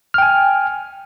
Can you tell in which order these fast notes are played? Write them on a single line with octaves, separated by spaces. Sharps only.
F6 G5 G#5